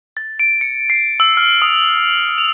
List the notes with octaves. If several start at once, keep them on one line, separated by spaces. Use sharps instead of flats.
A6
D7
C#7
C7
E6
F6
D#6
F7